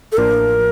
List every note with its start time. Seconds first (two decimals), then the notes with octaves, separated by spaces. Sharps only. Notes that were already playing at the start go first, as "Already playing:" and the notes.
0.12 A4
0.17 A1 A2 F3 A#3 D4 A#4